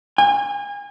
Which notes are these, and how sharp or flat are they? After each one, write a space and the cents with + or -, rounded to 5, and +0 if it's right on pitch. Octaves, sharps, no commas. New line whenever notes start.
G#5 -30